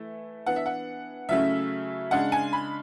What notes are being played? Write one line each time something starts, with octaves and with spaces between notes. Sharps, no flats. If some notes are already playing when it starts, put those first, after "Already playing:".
Already playing: E3 A3 E4
E3 B3 D4 F#5
E5
F#5
C#3 F#3 A3 C#4 E4 E5
C#3 G#3 D4 F#5
G#5
B5